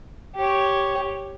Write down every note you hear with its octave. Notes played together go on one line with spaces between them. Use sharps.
G4 C#5